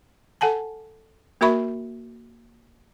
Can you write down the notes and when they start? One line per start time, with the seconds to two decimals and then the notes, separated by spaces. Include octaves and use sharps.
0.41 A4 F#5 G#5 A5
1.41 A#3 F#4 A#4 E5 B5 C#6